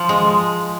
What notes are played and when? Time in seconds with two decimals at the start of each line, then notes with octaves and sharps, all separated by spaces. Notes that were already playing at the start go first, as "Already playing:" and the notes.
Already playing: F3
0.09 G#3